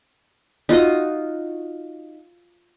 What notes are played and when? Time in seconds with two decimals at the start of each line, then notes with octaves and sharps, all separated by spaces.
0.69 D#4 F4 F#4 D#5